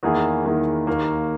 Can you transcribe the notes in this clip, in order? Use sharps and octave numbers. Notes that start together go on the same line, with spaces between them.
E2 D#3 A#3 E4 G#4
E2 D#3 A#3 E4 G#4
D#2 D#3 A#3